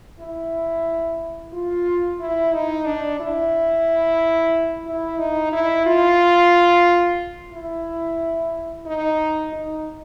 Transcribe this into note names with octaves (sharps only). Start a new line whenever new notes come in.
E4
F4
E4
D#4
D4
E4
E4
D#4
E4
F4
E4
D#4
D#4